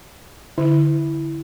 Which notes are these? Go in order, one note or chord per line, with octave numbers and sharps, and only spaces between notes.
D3 E4